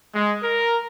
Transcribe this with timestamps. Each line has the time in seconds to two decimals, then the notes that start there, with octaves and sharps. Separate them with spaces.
0.14 G#3
0.43 A#4